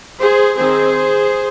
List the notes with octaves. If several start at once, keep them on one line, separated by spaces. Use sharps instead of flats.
G#4 C5
D#3 C4 G#4 C5